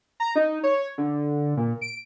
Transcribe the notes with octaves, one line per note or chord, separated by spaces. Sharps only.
A#5
D#4
C#5
D3
A#2
D7